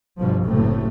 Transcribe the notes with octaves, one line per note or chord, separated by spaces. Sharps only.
G1 B2 F3
F#1 A2 C3 A3